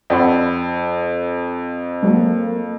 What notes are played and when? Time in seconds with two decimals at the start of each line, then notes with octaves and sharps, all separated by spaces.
0.10 F2 D5 F#5 B5
2.03 F#3 G#3 A#3